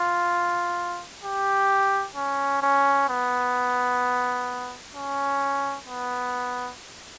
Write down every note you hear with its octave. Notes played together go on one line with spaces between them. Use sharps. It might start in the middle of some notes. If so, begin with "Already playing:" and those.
Already playing: F4
G4
C#4
C#4
B3
C#4
B3